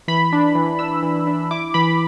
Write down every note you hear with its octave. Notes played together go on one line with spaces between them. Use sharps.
E3 B5
D4
E3
D4 E6
E3
D4
E4 D6
E3 B5